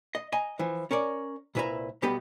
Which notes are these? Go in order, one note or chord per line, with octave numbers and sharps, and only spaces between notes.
D#5
D#5 G#5 A#5
E3 F3
C#4 A#4 C#5 D5
C2 A#2 E4 B4 E5 A#5
B1 G3 B3 G4 B4 D#5